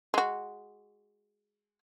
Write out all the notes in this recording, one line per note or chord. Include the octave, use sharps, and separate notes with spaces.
G#3 F#4